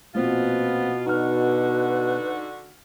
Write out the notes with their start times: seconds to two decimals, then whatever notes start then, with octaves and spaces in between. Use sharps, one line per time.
0.15 A#1 B2 B3 C4 F4
1.06 D3 D#4 F#4 B4 F6